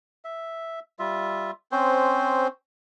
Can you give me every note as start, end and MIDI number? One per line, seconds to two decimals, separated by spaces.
0.25 0.80 76
0.99 1.51 55
0.99 1.51 65
0.99 1.51 76
1.72 2.48 60
1.72 2.48 61
1.72 2.48 72